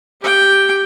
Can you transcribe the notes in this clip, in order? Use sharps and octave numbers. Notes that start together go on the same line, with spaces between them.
G4 G5